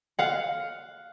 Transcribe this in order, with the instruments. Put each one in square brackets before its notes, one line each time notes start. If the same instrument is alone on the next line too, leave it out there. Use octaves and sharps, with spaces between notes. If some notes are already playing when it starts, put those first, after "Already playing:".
[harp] F5 F#5